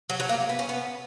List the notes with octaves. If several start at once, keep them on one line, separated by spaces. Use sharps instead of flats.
F#3
F#3
A#3
B3
C#4
B3